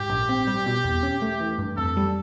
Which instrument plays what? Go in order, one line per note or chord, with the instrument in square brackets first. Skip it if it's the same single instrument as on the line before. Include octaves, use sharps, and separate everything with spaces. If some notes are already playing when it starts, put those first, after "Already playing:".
Already playing: [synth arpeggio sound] G#2 [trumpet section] G4
[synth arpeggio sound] A#1
C4
G3
B2
E2
C#4
A3
E3
G2
[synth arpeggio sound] F2 [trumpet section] A4
[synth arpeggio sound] G3